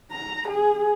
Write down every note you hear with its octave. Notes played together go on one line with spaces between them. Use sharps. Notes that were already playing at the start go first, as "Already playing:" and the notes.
A#5
G#4